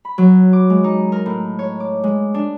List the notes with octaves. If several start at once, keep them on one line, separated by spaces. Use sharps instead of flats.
B5
F#3
D6
G#3
D#4
A#4
A2
C#5
D6
G#3
D4